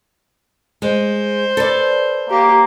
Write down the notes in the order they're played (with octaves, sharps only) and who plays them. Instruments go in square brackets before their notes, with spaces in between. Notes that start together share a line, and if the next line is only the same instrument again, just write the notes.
[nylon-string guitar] G#3 [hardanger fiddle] C5
[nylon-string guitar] A4 B4 D5
[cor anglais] A#3 [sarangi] G4